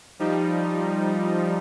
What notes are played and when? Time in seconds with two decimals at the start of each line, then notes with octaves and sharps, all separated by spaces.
0.19 F3 G3 D#4